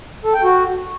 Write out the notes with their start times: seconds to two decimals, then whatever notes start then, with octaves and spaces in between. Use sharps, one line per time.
0.25 A4
0.34 G5
0.43 F#4